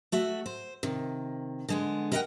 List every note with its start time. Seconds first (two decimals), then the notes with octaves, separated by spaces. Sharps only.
0.12 A3 F#4 E5
0.46 C5
0.83 C3 D#3
1.69 D3 G#3 B3
2.12 A#4 B4 D#5 E5 F#5 G5